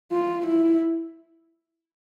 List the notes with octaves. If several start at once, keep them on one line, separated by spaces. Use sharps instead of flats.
F4
E4